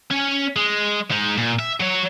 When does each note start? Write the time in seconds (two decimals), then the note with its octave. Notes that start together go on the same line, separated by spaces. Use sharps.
0.11 C#4 G#5
0.56 G#3
1.11 G#3 D#4
1.38 A#2
1.59 E5
1.80 F#3 C#5